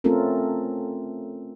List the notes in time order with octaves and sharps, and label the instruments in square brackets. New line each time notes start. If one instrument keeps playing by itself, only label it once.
[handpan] A3 C4 C#4 F4 A4 A#4